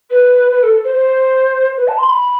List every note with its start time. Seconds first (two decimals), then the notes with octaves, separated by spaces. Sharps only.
0.10 B4
0.52 B4
0.63 A4
0.84 C5
0.94 C5
1.77 B4
1.87 A5
1.97 C6
2.08 B5